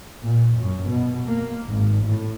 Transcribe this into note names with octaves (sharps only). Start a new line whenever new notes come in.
A#2
F#2
B2
A#3
G#1
A2